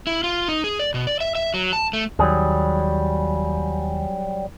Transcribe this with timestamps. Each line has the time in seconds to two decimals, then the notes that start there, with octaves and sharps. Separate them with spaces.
0.07 E4
0.24 F4
0.48 D#4
0.64 G#4
0.79 D5
0.94 B2
1.07 D5
1.20 E5
1.35 E5
1.54 F#3
1.73 A5
1.93 A3
2.19 D#2 F#3 G3 G#4